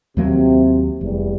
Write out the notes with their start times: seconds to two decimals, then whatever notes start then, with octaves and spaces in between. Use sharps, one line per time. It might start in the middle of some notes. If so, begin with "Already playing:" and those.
0.17 D#2 C3 F#3 A#3
1.01 F1 E2 G3